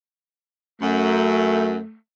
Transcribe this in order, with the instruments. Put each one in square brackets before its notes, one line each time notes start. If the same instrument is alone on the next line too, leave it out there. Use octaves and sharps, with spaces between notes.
[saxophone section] F#2 [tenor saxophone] A3